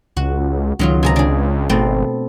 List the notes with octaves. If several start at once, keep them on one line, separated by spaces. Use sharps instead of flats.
C#2 F#4
C#2 D#3 F#3 F4
C3 G#4 A#5
D4 G#4
G#1 B2 A3 C4